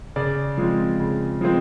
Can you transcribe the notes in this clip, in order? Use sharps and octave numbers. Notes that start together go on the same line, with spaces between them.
C#3 D5
F3 G#3 C4
C#3
F3 G#3 C4